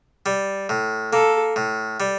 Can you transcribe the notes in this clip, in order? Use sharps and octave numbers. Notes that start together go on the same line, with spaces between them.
G3
A2
A#3 A4
A2
G3